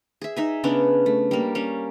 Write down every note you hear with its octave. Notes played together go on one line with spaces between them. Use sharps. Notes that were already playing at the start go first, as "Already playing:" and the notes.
G#4 E5
D#4 E5 G#5
C#3 B3 C#4 D4
A3
G3 A#3
G3 C#4